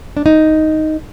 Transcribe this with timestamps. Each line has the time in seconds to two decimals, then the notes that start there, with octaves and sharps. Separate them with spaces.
0.17 D4
0.26 D#4